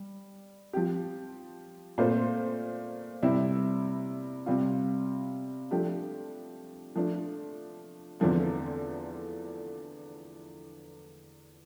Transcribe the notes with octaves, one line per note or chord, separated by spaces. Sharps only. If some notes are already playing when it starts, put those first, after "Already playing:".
Already playing: G3
F3 C4 G4
A#2 A3 C4 F4 C5
C3 G3 C4 E4
C3 G3 C4 F4
F3 A3 D4 G4
F3 A3 D4
E2 D3 F3 A3 C4